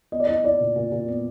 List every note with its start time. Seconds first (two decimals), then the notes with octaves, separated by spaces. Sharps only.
0.12 B3 D#5
0.20 D5
0.27 E4 D#5
0.44 E4 D5
0.60 A#2
0.76 A#2
0.91 A#2
1.08 B3